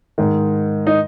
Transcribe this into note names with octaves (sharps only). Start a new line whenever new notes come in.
G#2 D#3
D#4